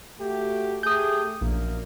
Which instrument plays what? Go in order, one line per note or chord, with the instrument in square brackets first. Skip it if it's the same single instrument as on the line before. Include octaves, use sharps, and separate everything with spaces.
[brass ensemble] A3 F#4 G4
[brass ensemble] A3 G4 G#4 [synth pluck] D#6 G6
[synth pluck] A#1 [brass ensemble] F#2 A#2 A#3